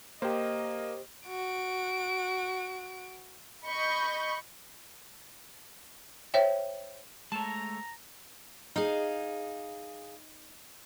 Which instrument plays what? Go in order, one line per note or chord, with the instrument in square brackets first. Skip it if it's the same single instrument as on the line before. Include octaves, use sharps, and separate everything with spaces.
[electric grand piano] A#3 [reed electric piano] G4 C5 [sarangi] D#5
[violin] F#4 D7
[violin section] D#5 B5 C#6 G6
[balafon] C5 C#5 E5 G5
[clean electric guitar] G#3 A3 C#5 [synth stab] A5 [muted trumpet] A#5
[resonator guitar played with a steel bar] D#4 [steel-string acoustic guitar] G#4 F5